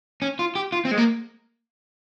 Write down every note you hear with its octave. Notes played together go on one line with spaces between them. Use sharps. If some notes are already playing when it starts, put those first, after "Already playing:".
C#4
F4
G4
F4
C4
G#3
A#3